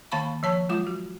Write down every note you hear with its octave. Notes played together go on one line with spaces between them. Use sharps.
D#3 A#3 F5 A5 B5 C#6
F3 C#5 A5 C#6
F#3 G#3 F4 D6
F#4